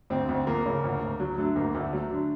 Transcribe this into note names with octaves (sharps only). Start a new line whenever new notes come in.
D2 C4
D2
F3 A#3
C#3
D2
D2
F#3
D3 A3
D2 A#3
D2 A3
F#3 A3
D3